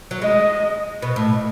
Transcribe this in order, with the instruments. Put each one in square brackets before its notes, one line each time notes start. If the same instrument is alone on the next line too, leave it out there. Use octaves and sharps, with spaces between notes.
[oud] F#3
[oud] G#3 [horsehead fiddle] D#5
[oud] B2
A2